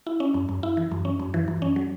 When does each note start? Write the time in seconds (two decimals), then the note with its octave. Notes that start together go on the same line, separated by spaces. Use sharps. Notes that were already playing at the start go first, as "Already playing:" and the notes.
0.07 E4
0.20 C#4
0.34 F#2
0.49 F#2
0.63 E4
0.77 E3
0.91 F#2
1.05 C#4
1.20 F#2
1.34 E3
1.48 F#2
1.62 C#4
1.76 F#3